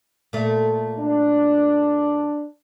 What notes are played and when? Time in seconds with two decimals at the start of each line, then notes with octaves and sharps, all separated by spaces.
0.33 A#2 A3
0.99 D4